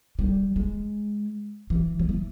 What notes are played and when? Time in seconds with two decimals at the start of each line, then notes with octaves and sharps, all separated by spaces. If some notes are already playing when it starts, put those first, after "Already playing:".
0.19 G3
0.56 G#3
1.70 E3
1.99 F3
2.09 E3